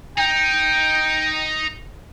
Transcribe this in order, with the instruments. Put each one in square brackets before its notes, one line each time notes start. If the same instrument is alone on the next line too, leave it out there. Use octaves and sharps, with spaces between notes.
[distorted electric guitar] D#4 [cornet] G5